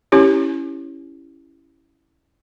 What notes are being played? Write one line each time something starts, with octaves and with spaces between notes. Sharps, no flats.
C#4 E4 G4 C#5